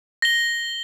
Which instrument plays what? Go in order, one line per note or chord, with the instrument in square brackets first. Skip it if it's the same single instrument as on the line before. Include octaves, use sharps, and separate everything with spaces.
[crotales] A#6 G7